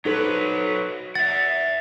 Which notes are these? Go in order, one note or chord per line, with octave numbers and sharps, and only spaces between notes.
F#3 D#4 A4 B4 C5
E5 F#5 A6